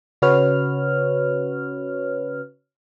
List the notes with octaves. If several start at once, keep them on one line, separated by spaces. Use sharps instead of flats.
C#3 C#4 F#4 B4 C#5 F6